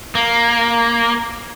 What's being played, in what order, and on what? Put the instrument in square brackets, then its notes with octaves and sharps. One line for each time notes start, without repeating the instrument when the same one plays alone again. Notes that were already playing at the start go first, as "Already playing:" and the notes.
[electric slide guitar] A#3